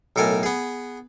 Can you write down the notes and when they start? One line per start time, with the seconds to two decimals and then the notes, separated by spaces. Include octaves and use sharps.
0.16 B1 A2 A4 A#4 G#5
0.43 B3 G#4